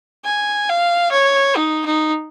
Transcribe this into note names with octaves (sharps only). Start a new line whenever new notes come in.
G#5
F5
C#5
D#4
D#4